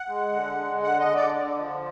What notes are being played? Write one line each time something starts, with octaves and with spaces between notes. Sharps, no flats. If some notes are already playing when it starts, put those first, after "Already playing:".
Already playing: F#5
G#3
D3
G#3
D3 F#5
D#5
D3
D5
D3
F3